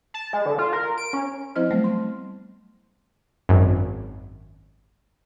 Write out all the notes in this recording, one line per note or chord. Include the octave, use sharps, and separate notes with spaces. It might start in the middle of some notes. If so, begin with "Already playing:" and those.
A5
G#3
D3
F4
A#4
D7
C#4
F3 C4 E4 C5 D#5 F6
F#3 G3 A3 B3
C6
G#1 F#2